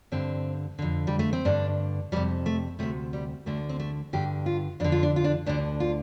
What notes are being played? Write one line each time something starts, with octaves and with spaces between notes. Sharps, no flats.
G2 D3 C4
F2 D3
G3
A3
C4
G2 D3 D4
F2 C3 G3
A3
D2 C3 A3
G3
D2 D3 A3
C4
A3
G2 D3 G4
F4
F2 D3 D4
F4
D4
F4
D4
D2 D3 D4
F4